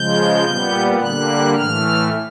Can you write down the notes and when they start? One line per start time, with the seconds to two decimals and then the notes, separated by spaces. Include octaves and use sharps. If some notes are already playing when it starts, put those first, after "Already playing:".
Already playing: C#3 F3 G#3 G6
0.45 A#2 G3 B3
1.00 D3 G3 A#3 F#6
1.54 A2 E3 A3 F6